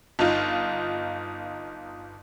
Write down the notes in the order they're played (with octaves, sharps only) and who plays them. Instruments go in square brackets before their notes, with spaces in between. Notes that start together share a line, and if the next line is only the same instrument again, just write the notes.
[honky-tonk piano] G1 D#4 F4